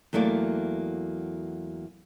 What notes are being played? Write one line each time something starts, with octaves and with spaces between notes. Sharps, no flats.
E2 F#3 A3 A#3 D5